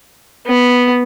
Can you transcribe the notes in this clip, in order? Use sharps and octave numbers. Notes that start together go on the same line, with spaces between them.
B3